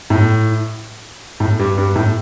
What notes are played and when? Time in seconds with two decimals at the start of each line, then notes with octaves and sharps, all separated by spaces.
0.10 A2
1.40 A2
1.59 G2
1.78 G2
1.96 A2